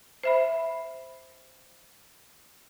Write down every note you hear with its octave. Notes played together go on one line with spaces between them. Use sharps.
C5 E5 B5